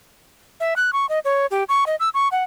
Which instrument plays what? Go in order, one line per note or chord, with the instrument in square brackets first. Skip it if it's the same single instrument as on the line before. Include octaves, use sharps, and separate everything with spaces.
[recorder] E5
F#6
C#6
D#5
C#5
G4
C#6
D#5
E6
C#6
F#5